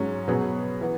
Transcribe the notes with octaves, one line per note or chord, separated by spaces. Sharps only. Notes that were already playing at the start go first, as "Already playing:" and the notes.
Already playing: G#2 F#3 C#4
B2 F#3 C#4 G#4 B4
E3 B3